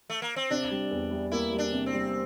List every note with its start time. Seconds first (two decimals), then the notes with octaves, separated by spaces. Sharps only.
0.10 A3
0.22 A#3
0.36 C4
0.50 C3 D4
0.71 G3
0.91 E2
1.11 G3
1.32 A#3 E4
1.52 G3
1.58 D4
1.72 C3
1.86 C4
1.94 G3